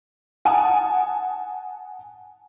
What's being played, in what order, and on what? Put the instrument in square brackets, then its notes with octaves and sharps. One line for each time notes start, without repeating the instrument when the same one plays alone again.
[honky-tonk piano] F#5 G#5 A5 D#6